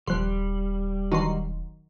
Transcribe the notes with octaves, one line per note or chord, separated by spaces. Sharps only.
D#1 D3 F3 G3 C6 F#6
D#3 E3 F#3 D4 F#4 C6